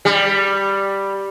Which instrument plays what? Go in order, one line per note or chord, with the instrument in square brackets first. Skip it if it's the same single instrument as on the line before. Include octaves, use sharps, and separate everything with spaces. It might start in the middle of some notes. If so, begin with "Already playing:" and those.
[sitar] G3